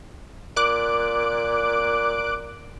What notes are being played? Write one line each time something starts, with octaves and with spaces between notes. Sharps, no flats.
A#2 D6 F#6 D7